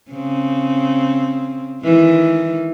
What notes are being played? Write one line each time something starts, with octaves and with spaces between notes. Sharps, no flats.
C#3 C4
D#3 E3 G#3